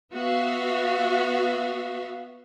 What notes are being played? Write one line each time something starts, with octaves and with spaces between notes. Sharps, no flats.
B3 F#4 E5 F5